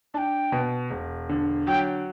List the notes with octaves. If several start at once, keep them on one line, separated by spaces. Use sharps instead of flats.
D4 G5 A5
B2
E1
D3
F#3 G5